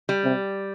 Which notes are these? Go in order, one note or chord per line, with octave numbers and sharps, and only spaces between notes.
G3
C3